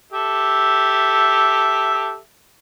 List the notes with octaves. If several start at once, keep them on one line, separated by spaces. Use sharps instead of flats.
G4 A4 E5